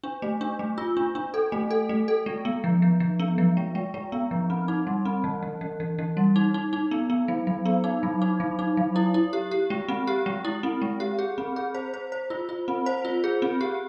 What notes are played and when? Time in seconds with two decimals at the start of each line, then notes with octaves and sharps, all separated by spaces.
0.03 D4
0.22 A3
0.41 D4
0.59 A3
0.78 F4
0.97 D4
1.15 D4
1.34 A4
1.52 A3
1.71 A4
1.89 A3
2.08 A4
2.26 G#3
2.45 B3
2.64 F3
2.82 F3
3.00 F3
3.19 B3
3.38 F3
3.57 G#3
3.75 G#3
3.94 G#3
4.12 B3
4.31 F3
4.50 C4
4.68 D#4
4.87 G3
5.05 C4
5.24 E3
5.43 E3
5.61 E3
5.80 E3
5.99 E3
6.17 G3
6.36 D#4
6.54 D#4
6.73 D#4
6.91 B3
7.10 B3
7.28 F#3
7.47 F#3
7.65 B3
7.84 D#4
8.03 F#3
8.22 D#4
8.40 F#3
8.59 D#4
8.77 F#3
8.96 E4
9.14 E4
9.33 G4
9.51 G4
9.70 G#3
9.88 C4
10.07 G4
10.26 G#3
10.45 E4
10.63 C4
10.82 G#3
11.00 G4
11.19 G#4
11.38 C4
11.56 G#4
11.75 C5
11.94 C5
12.12 C5
12.30 F4
12.49 F4
12.68 C4
12.86 C5
13.05 F4
13.24 G#4
13.42 C4
13.61 G4